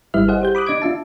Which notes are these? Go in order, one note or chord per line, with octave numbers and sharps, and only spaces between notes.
G#1 G3 E4 B4 E5 F6
G#4 C5 D#5 F#5
G4 C5 G6
B5 D6 D#6 F#6
D4 D#5 D6 G#6 D7
D4 F4 E5 A5